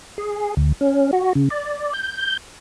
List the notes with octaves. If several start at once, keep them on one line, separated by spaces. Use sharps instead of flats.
G#4
D2
C#4
F#4
C#3
D5
G6